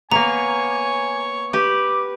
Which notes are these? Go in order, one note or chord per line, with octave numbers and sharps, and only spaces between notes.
A#3 B3 C#5 G#5 A#5
G4 B4 D6